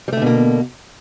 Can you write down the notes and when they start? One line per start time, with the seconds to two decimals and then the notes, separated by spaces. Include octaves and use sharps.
0.08 G3
0.13 A3
0.17 D3
0.22 B2
0.26 A#3